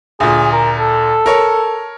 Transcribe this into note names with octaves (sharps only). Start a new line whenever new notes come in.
D2 A#2 G#4
A#4
A4
A#4 C#5